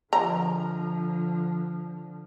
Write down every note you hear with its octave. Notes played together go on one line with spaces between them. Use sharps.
D3 F3 A#5